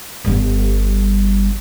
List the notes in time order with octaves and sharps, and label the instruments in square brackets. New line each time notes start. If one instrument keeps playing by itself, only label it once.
[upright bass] G1 G3